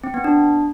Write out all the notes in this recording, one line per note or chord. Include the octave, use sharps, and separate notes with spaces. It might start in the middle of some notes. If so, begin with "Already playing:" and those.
C4
B3
D4